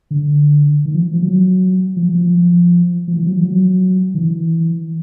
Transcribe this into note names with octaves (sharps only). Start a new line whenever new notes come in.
D3
D#3
F3
F3
F#3
F3
F3
F3
F3
E3
F#3
F3
F#3
D#3
E3